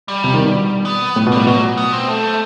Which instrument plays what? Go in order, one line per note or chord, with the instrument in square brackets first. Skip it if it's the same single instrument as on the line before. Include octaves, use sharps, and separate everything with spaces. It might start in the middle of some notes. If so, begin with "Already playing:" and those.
[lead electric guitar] G3
[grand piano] C3
D#3
B2
[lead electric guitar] B3
[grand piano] A2
B2
[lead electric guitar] G3
[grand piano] A2
[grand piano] B2 [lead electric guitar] F#3
[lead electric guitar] B3
C4
A3